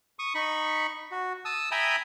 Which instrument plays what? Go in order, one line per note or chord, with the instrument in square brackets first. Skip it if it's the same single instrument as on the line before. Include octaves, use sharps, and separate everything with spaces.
[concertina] C#6 D#6
D#4 B5 C#6
F#4
A5 D#6 E6
E5 G5 G#5 A#5 B5 D#6